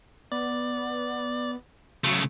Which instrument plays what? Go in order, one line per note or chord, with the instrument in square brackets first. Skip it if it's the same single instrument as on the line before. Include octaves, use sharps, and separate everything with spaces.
[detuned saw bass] B3 [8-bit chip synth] D5
[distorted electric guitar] C#3 A3 [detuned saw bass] F#3